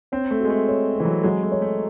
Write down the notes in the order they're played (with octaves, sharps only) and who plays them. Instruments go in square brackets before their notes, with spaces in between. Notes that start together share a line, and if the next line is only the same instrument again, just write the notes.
[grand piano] C4 [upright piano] C#5
[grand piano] A3
[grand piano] G#3 [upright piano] F#4
[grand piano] A3
[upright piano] C#5
[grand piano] E3 [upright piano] C4
[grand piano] F#3
[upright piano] F#3 [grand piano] G#3
[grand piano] A3
[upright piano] C#5
[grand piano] A3